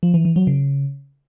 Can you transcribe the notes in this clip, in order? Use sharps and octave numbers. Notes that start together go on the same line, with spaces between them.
F3
E3
E3
F#3
C#3